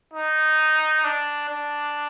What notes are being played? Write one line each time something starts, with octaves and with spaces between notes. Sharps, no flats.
D#4
D4
D4